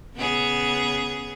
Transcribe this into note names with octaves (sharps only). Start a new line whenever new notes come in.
C#3 B3 G#4